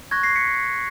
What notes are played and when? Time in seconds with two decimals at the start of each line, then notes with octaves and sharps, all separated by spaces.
0.11 C#6 F#6 G#6 A#6
0.23 A#6 C7
0.35 B6 C#7